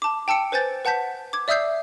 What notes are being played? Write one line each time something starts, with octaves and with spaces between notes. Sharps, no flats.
A5 D6
G5 A5 E6 C#7 D7
B4 C5 G#5 G6 A6
B4 F#5 A5 G6 B6
D6 G#6
D5 E5 D#6 E6 G6 C7